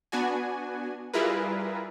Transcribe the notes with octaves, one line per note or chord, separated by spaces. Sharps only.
B3 D4 F#4 G#5
G3 E4 F4 G#4 A#4 B4